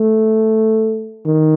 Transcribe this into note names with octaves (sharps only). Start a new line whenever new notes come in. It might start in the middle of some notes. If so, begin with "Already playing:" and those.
Already playing: A3
D#3